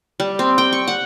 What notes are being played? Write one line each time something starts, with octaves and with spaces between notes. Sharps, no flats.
G3
C4
G5
C#6
F#5